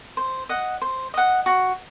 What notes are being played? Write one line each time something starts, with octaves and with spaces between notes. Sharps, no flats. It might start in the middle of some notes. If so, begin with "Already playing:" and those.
C5
D#5 F#5
C5
D#5 F#5
F#4